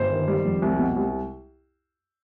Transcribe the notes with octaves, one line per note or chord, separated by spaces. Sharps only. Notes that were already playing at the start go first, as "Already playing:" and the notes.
Already playing: G1 C5
D#3
G3
F2
C2
B2
C2